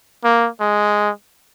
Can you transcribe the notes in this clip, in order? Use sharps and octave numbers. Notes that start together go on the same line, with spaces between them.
A#3
G#3